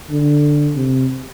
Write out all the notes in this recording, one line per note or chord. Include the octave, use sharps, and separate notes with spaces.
D3
C3